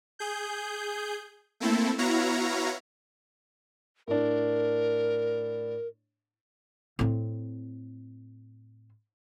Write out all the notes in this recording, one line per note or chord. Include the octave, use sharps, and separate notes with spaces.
G#4 G6
A3 A#3 C4 E4 A4
B3 E4 F#4 C#5 F5 A#5
A2 D4 A#4
A2 C4